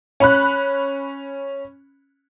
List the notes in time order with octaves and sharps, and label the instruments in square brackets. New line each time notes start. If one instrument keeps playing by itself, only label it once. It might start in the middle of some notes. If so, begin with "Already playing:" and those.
[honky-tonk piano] C#4 B5 F#6